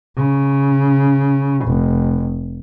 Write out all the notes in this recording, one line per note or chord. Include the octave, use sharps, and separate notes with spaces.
C#3
F1